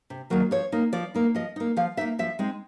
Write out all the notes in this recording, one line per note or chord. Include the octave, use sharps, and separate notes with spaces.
C3
D#3 F#3 A#3
F3 C#5
A#3 D#4
F3 D5
A#3 D#4
F3 D#5
A#3 D#4
F3 F5
A#3 D#4 E5
F3 E5
G#3 C4 D#4